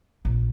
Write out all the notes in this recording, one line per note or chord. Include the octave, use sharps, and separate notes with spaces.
A#1